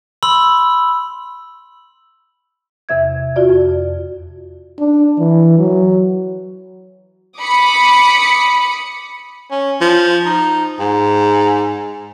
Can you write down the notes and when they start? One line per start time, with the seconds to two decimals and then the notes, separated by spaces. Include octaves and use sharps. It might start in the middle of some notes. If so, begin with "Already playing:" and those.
0.23 B5 C6 E6 F#7
2.89 E2 C3 E5 G#6
3.36 F4 F#4 D5
3.50 F2
4.79 D4
5.19 E3
5.58 F#3
7.39 B5 D6 D#6 C#7
9.51 C#4
9.81 F3
10.26 D#4
10.80 G#2